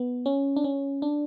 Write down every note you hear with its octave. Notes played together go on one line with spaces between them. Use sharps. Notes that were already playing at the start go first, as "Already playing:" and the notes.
Already playing: B3
C#4
D4
C#4
D4